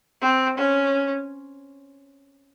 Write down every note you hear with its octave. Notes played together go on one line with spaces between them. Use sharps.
C4
C#4